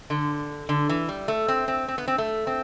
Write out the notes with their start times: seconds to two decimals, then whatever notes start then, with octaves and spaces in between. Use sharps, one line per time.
0.10 D3
0.69 D3
0.89 E3
1.09 G3
1.28 A3
1.48 C4
1.68 C4
1.88 C4
1.98 B3
2.08 C4
2.18 A3
2.47 C4